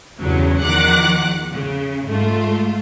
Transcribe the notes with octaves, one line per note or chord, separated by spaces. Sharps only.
E2 G2 C#3 F#3
E2 D#3 F3 F#5 D6 F#6
C#3
G#2 A3 F4